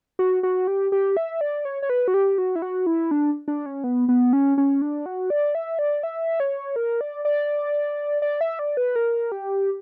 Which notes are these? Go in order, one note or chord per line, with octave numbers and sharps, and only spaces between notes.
F#4
F#4
G4
G4
E5
D5
C#5
C#5
B4
F#4
G4
F#4
E4
F#4
E4
D4
D4
C#4
B3
B3
C#4
C#4
D4
F#4
D5
E5
D5
E5
C#5
A#4
D5
D5
D5
E5
D5
B4
A#4
G4